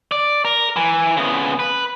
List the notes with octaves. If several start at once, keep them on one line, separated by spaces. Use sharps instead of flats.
D5
A#4
E3
C#3 B3
B4